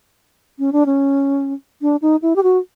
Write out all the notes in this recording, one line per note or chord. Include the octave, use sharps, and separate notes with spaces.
C#4
D4
C#4
D4
D#4
E4
G4
F#4